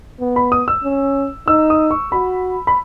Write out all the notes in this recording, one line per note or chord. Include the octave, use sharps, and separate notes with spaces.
B3
B5
D#6
E6
C#4
D#4 E6
D#6
C#6
F#4 B5
B5